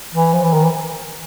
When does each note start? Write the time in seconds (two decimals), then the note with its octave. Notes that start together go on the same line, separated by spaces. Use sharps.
0.14 E3
0.33 F3
0.43 E3
0.53 D#3
0.63 E3